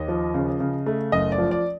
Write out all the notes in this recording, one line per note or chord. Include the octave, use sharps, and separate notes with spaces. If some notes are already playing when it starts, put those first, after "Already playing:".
Already playing: D#2 D#5
F3
C#3
C#3
A3
F#1 D#5
D5
F3
D5